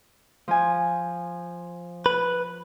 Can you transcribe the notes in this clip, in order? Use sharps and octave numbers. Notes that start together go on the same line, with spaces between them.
F3 G#5
B4